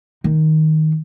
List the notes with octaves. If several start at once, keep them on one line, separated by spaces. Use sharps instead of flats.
D#3